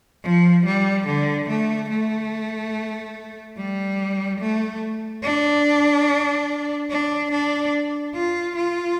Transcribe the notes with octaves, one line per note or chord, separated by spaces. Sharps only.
F3
G3
D3
A3
A3
G3
A3
D4
D4
D4
F4
F4